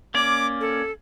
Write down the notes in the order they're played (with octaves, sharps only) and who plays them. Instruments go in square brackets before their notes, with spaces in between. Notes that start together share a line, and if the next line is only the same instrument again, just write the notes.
[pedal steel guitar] A#3 C#4 D5 [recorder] D6
[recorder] A4